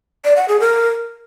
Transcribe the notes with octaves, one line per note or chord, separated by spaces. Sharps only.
D5
F#5
G#4
A#4